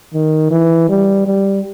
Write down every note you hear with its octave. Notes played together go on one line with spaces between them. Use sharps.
D#3
E3
G3
G3